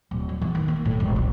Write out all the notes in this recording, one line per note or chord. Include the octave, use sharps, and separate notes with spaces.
D1
F3
E2
D#3
A#3
A2
E1
C2